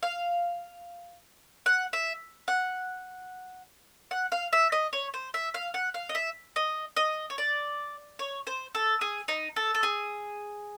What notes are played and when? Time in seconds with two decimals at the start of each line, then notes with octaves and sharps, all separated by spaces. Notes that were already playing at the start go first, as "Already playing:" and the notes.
0.03 F5
1.66 F#5
1.93 E5
2.48 F#5
4.11 F#5
4.32 F5
4.53 E5
4.72 D#5
4.93 C#5
5.14 C5
5.34 E5
5.54 F5
5.74 F#5
5.94 F5
6.09 D#5
6.15 E5
6.56 D#5
6.96 D#5
7.30 C#5
7.38 D5
8.19 C#5
8.47 C5
8.75 A4
9.01 G#4
9.28 D#4
9.56 A4
9.75 A4
9.83 G#4